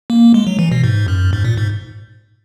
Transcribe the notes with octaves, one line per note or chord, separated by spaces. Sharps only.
A#3
G#3
F#3
E3
B2
G#2
F#2
G#2
A#2
G#2